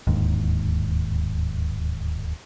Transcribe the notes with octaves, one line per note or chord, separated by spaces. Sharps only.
D1 D#2 G#2